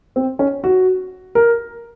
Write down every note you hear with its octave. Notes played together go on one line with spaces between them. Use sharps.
C4
C#4
F#4
A#4